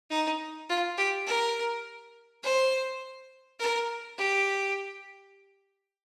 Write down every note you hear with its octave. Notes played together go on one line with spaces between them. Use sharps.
D#4
F4
G4
A#4
C5
A#4
G4